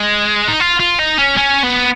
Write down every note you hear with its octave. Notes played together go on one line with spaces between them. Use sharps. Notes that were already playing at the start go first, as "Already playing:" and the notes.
Already playing: G#3
D#4
F4
F4
D#4
C#4
C#4
B3